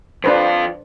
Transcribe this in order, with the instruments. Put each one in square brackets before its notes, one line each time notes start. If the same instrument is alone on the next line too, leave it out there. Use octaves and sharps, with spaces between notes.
[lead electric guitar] F2 F4 [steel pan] D4 B4 C5